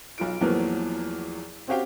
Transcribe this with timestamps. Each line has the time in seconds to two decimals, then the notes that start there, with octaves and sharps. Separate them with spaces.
0.18 B1 F4 D7
0.41 E2 A2 F3 F#3 A#3 B3
1.68 C4 C#4 F#4 G4 F5 G5